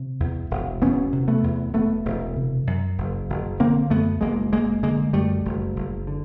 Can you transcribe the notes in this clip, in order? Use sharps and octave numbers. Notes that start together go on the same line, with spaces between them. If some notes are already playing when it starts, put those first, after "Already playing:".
Already playing: C3
E2
E1
E1 B3 C#4
C3
A3 B3
E2
E1 A3 B3
E1
C3
F#2
F#1
F#1
D3 A#3 C4
F#2 A3 B3
F#1 G#3 A#3
F#1 G#3 A#3
D3 G#3 A#3
F#2 G3 A3
F#1
F#1
D3